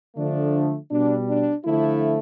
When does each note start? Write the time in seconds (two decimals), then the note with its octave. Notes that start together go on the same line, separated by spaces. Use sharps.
0.17 D3 F3 A3 D4
0.91 B2 G3 D4
1.29 D4
1.65 D3 F3 A3 E4